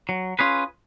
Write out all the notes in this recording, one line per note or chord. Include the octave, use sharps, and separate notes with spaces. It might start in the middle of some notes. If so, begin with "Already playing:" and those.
F#3
C#4 F4 G#4 B4